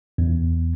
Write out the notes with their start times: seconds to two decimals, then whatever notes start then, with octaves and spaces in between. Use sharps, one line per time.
0.18 E2